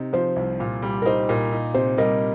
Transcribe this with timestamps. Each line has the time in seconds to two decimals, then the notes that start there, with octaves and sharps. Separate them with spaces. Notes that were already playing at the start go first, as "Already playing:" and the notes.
Already playing: C3 D#4
0.13 F3 C5
0.36 C2
0.60 A#2
0.83 G3
1.02 A#4
1.05 D#4 C5
1.29 A#2 A#4
1.52 D#4
1.74 C3 C5
1.98 G3 A#4 D#5